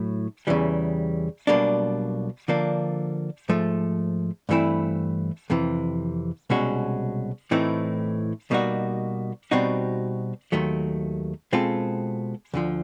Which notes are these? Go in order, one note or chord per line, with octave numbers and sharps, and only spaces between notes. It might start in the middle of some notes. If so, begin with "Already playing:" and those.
Already playing: A2 F#3 E4
E2 C#3 E3 G3
B1 B2 G3 A#3 D4
D3 F3 A#3 D4
G#2 F3 A3
G2 E3 A3 C4 E4
F2 C3 E3
C2 B2 G#3 C#4 F#4
A2 E3 A3 C4 D#4
B2 G3 A#3 D#4 F#4
B2 G3 C4 D#4 F#4
D#2 D#3 F#3 A3
B2 G#3 C4 F4 A4
D2 D3 F3